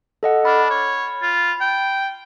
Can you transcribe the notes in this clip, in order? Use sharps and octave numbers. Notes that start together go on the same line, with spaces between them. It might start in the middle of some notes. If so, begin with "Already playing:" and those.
A4 D#5 F#5
D4 B5 F6
C#5
F4
G5